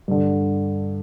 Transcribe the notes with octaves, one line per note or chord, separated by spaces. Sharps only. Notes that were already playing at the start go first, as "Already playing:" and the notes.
G2 D3